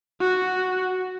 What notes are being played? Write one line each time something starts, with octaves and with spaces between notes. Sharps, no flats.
F#4